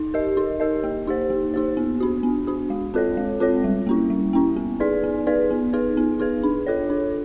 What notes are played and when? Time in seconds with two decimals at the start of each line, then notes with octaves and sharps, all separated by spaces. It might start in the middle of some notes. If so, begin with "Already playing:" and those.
Already playing: D#4
0.14 G4 A#4 D#5
0.37 D#4
0.60 G4 A#4 D#5
0.84 A#3
1.07 D#4 G4 C5
1.30 A#3
1.54 D#4 G4 C5
1.77 B3
2.00 D4 F#4
2.23 B3
2.47 D4 F#4
2.70 G#3
2.94 C4 F4 A4 C#5
3.17 G#3
3.40 C4 F4 A4 C#5
3.64 G3
3.87 A#3 C#4 E4
4.10 G3
4.33 A#3 C#4 E4
4.56 B3
4.80 D#4 G#4 B4 D5
5.04 B3
5.27 D#4 G#4 B4 D5
5.51 B3
5.73 D#4 G#4 B4
5.97 B3
6.19 D#4 G#4 B4
6.43 D4
6.66 F4 A4 C#5
6.90 D4